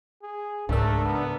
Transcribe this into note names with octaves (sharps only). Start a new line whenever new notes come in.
G#4
C#2 G#2 C#3 A3 D4 A#4 E6
B3